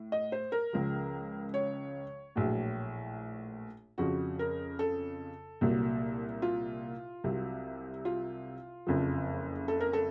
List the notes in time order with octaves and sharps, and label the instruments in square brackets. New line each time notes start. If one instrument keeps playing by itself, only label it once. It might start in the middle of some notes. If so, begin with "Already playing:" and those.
Already playing: [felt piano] A2
D#5
C5
A#4
C#2 C#3 F3
C#5
A#1 A2 F#3
F2 C#3 F3 F#4
A#4
A4
C2 A#2 F#3
F4
C2 C3 F#3
F4
F#1 F2 C#3 F3
A4
A#4
A4